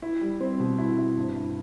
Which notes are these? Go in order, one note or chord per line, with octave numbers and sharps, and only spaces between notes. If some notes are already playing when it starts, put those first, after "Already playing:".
E4
G3
C4
B2
E4
E4
G2
E4